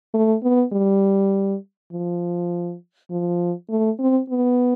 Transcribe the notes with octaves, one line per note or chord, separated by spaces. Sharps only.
A3
B3
G3
F3
F3
A3
C4
B3